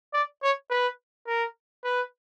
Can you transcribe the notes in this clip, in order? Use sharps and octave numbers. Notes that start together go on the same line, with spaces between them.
D5
C#5
B4
A#4
B4